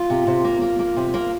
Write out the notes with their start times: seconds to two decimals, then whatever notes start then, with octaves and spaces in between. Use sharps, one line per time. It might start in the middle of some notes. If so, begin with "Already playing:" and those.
Already playing: F4
0.10 C3
0.27 C3
0.44 A#3
0.62 A#3
0.79 A#3
0.96 C3
1.14 A#3